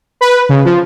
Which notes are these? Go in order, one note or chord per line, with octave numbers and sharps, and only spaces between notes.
B4
C#3
F3